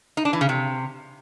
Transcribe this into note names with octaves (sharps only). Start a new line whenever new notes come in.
D#4
D4
E3
C#3
C3